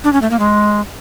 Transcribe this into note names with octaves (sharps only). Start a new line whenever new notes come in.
D4
C#4
A3
A#3
G#3